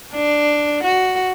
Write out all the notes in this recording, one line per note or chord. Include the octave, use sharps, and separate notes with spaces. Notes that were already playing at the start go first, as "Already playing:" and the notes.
D4
F#4